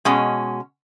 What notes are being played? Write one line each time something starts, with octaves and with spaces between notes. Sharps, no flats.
B2 G#3 C#4